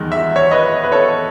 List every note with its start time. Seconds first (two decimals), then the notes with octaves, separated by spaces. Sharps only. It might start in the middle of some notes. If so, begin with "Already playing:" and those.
Already playing: E2 D#3 G#3
0.12 E5
0.36 C#5 E5
0.51 B4 D#5
0.84 B4
0.92 A4 C#5